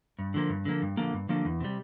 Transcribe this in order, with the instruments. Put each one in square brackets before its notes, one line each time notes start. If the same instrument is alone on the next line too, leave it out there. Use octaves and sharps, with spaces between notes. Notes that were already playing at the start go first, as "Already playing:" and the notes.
[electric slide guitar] G2
D3 F3 A#3
G2
D3 F3 A#3
G2
D3 F3 A#3
G2
D3 F3 A#3
E2
C3 G3